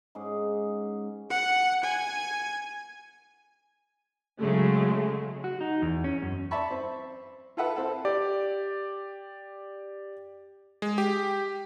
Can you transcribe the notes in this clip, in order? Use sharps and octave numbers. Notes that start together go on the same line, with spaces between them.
G#2 C#4 G#4 D6
F#5
G#5
C#3 F#3 G#3 A3
F#4
D#4
E2
C#4
F#2
D5 E5 A5 B5 C#6
C4
F4 A4 B4 E5 F#5
C4 E4 A4
G4 D5
G#3
G4